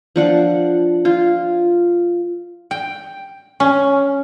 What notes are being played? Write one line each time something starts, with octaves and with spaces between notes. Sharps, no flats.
F3 D4 F#5
F4
G5
C#4